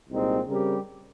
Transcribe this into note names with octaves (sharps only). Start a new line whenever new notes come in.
C2 A#2 G#3 C4 D#4
C#3 G3 C4 G4 A#4